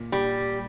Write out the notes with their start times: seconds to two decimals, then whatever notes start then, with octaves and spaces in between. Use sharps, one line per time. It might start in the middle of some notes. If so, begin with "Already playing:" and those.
Already playing: A#2
0.12 G3